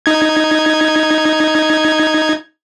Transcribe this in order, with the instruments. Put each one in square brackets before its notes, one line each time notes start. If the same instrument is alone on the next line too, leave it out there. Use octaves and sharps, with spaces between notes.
[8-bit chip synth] D#4 G#6